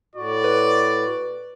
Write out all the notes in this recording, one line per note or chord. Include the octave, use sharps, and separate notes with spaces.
A2 F#4 D5
B4